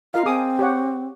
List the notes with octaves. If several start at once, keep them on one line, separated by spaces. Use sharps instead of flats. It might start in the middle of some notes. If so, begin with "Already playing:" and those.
F4 A#4 D#5 F5
C4 G#4 D6 D#6
G4 C#5 F#5